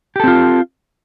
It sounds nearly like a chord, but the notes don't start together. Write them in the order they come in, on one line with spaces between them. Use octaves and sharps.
G4 A4 C4 F4